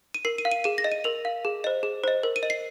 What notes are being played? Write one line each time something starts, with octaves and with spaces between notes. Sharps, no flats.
D#7
A#4 C7
D#7
F5
D#7
G#4 D#7
A#6
D#5
D#7
A#4 F7
F5
G#4
C5 D#5
G#4
C5 D#5
A#4
D#7
D#5
C7